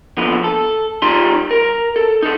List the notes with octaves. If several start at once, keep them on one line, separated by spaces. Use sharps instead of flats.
A#2 D3 F3 B3
A4
G3 D#4 F4 C6
A#4
A4
D#4 A4